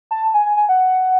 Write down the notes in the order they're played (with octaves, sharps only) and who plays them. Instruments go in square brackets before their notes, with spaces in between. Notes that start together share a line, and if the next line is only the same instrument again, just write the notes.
[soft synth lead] A5
G#5
G#5
G#5
F#5